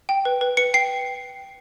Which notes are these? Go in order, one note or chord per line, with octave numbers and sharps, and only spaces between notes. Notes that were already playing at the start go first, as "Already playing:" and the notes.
G5
B4
B4
B4 C#7
G5 C7